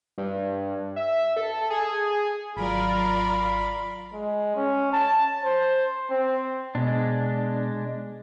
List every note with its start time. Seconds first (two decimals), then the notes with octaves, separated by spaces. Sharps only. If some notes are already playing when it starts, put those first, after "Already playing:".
0.18 G2
0.96 E5
1.36 A4
1.70 G#4
2.57 G#1 F#3 F4 A#4 D5 B5
4.14 G#3
4.56 C#4
4.93 A5
5.45 C5
6.11 C4
6.75 B2 G#3 D4